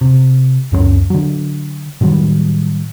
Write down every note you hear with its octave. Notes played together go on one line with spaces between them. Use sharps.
C3
C#2 F#2 A3 C#4
D3 F#3
A2 D#3 F#3 G3